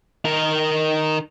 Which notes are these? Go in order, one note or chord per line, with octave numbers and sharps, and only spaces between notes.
D#3 A#4